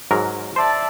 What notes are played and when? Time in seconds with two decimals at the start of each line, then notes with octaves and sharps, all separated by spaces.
0.11 G#2 F#3 A#4
0.56 C5 D5 E5 A5